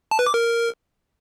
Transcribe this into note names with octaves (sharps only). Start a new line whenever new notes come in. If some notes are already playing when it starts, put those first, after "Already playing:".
A5
B4
D6
A#4